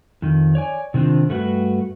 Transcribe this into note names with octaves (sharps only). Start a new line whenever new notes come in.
F2 D#3
C#5 D5 G#5
C3 D#3 C4 D4 F4
G2 A3 F#4 G#4 B4